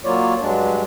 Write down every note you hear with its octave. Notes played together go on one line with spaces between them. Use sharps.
F#3 A#3 F4 C#5 D5
G2 F#3 G#3 D4